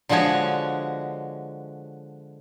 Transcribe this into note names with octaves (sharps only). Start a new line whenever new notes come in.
D3 F3 G#3 F#4 C#5